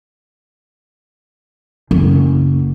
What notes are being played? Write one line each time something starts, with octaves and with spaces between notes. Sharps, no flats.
F#1